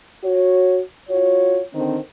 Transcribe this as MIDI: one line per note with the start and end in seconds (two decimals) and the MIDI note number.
0.23 0.79 66
0.23 0.79 73
1.09 1.60 65
1.09 1.60 66
1.09 1.60 73
1.74 1.97 50
1.74 1.97 51
1.74 1.97 60